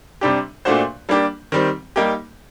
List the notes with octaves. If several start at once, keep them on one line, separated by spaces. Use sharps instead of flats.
C3 G3 D4 G4
A#2 A3 D4 F#4 C5
G3 A#3 D4 G4
D#3 G3 C4
G3 A#3 D#4 G4